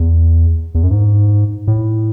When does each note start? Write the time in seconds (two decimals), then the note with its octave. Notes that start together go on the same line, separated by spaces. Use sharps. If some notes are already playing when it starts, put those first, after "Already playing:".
Already playing: E2
0.75 E2
0.83 F#2
0.91 G#2
1.68 A2